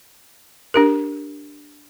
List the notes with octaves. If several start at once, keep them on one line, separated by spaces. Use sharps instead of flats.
D4 G4 A#4